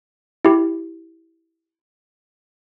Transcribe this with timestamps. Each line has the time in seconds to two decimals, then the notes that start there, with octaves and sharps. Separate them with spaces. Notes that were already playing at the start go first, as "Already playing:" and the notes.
0.45 E4 G4